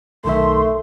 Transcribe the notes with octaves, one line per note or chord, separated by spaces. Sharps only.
B1 D#3 A3 E5 C6